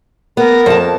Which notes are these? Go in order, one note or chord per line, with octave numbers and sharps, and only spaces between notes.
B3 A#4
F2 A5